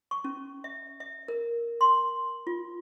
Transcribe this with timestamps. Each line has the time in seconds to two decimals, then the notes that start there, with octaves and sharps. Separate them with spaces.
0.11 C#6
0.24 C#4
0.64 E5
1.00 E5
1.28 A#4
1.81 C6
2.47 F4